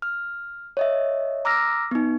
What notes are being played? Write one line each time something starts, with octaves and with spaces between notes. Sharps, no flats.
F6
C#5 D#5 E5
A#5 D6 E6 F6 A#6
B3 D#4